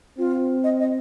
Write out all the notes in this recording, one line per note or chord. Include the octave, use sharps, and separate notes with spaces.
C4 F4
D#5
D#5